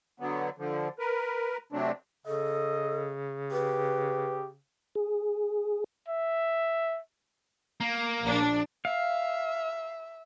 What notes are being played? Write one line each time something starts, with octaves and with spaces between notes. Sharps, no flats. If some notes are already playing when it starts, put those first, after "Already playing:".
D3 F#3 B3
D3 F3
A#4 B4
C3 F#3 A3 C4 D4
C#3 A4 D#5
G4 B4
G#4
E5
A#3
A#1 D4
E5 F5